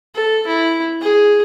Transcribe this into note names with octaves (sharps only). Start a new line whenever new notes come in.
A4
E4
G#4